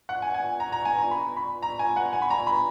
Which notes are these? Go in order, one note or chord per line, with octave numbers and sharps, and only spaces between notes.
F#5
G#5
G#5
A#5
A#5
G#5
A#5
B5
B5
A#5
G#5
F#5
G#5
B5
A#5
B5